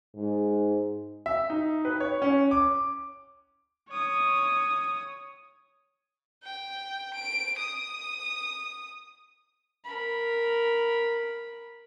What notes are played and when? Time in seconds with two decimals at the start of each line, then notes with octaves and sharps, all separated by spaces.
0.15 G#2
1.26 E5
1.50 D#4
1.85 B4
2.00 C#5
2.22 C#4
2.51 D6
3.89 C#5 D#6
6.43 G5
7.15 D7
7.59 D#6
9.84 A#4 B5